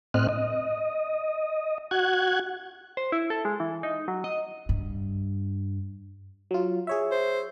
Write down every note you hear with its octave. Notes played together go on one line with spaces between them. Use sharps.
A2 C4 D#5 F6 F#6
D#5
F#4 F#5 F#6 G#6
C5
E4
A4
G#3
E3
D#4
F#3
D#5
G2
F#3 F4
G#4 C#5 E5
C5